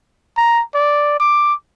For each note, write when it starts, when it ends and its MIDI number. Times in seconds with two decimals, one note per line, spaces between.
0.37 0.62 82
0.75 1.20 74
1.20 1.54 86